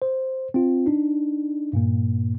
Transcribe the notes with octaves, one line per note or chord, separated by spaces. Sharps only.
C5
C4 F4
D4 D#4
G2 A#2 A#3